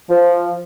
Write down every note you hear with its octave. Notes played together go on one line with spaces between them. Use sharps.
F3